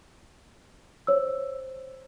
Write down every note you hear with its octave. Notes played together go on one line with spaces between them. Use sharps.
C5 C#5 E6